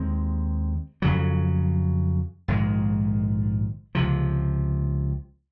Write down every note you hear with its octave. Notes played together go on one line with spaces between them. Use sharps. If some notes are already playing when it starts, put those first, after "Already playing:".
Already playing: D#2 D#3 G#3 C4
F2 C#3 F#3
A#1 G#2 D#3 G#3
C#2 C3 F3